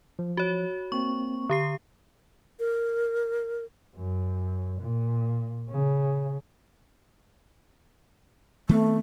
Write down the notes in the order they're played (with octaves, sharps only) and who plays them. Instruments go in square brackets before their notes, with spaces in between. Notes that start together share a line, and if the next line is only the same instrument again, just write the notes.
[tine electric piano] F3
[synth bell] F#4 C#5
[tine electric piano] A#3 C4 [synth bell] C#6
[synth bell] D3 G4 C7
[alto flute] A#4
[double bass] F#2
A#2
C#3
[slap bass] D#3 B3 C4 [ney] A3